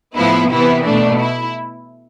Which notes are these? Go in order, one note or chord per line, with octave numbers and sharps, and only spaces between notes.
A2 F3 B3 E4
C3 E3 B3 E4
B2 A3 D4
E4